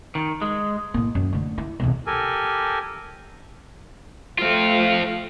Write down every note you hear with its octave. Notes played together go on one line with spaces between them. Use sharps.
D#3
G#3
A2 A#3
F#2 F#3
D3 A3
E4
B1 E2
G4 A4 A#4 G#5
F3 A3 C4 F4 F5